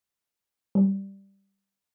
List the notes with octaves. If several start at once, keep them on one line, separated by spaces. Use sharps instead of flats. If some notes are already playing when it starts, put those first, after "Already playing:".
G3